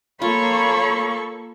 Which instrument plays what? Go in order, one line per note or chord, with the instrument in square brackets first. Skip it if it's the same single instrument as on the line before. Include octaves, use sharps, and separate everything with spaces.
[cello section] A#3 [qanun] F4 [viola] A4 C#6 [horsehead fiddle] C#5 B5